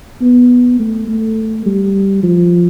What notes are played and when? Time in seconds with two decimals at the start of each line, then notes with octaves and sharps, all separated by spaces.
0.21 B3
0.79 A3
1.08 A3
1.66 G3
2.23 F3